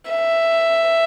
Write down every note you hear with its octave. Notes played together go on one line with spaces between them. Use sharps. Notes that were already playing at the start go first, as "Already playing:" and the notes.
E5